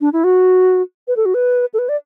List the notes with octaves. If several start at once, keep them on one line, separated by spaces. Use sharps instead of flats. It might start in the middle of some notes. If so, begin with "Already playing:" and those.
D4
E4
F#4
B4
A4
F#4
B4
A4
B4
D5